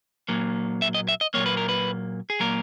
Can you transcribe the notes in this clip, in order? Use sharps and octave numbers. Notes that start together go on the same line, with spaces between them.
A#2 F#3 A#3
E5
D#5
E5
D#5
A#2 F#3 A#3 C#5
B4
A#4
B4
G#4
A#2 F#3 A#3 A#4